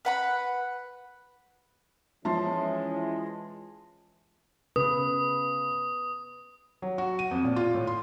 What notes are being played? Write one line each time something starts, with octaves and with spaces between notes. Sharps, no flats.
B4 F#5 B5
E3 F3 G#3 C#4 E4 A5 C6
C#3 B4 D#6
F#3
F#4
D#7
F2
A#2
F4
A2
C6